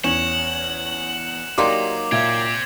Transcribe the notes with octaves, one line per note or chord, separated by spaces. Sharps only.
E2 C#4 F#5 E7 F#7
F#3 A#3 D#4 G4 D5 C6 D6
A#2 C4 G4 E5 F5 G#6